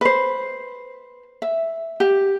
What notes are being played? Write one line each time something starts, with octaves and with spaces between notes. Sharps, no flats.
B4 C5
E5
G4